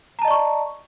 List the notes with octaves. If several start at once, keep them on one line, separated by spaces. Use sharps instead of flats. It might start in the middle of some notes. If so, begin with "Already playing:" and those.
D5 D#5 A5 A#5 C#6